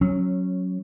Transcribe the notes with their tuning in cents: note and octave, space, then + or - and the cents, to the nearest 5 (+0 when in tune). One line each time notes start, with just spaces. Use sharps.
F#3 +0 C#4 -15